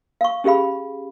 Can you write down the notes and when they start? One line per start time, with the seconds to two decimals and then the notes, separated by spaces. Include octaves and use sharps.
0.21 F5 C#6
0.44 C#4 G4 G#4 F5 B5